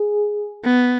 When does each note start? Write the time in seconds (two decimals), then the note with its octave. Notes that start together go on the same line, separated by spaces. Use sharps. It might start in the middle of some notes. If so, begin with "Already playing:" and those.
Already playing: G#4
0.64 B3